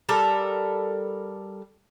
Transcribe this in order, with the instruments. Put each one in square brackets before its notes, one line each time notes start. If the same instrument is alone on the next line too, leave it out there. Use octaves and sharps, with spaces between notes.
[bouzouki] G3 A4 A#4